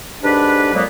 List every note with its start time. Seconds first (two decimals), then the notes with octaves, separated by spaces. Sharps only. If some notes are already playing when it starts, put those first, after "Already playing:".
0.23 G#2 D3 D4 G4 B4
0.74 F2 A#2 F#3 G#3 A#3 B3